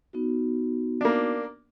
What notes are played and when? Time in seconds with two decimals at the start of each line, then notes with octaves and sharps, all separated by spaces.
0.13 B3 D#4 F#4
1.01 A#3 D4